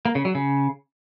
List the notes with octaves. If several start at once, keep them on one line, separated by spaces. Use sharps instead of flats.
A#3
C#3
F#3
C#3